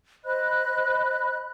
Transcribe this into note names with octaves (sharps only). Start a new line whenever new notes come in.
C5 D#5 B5 F#6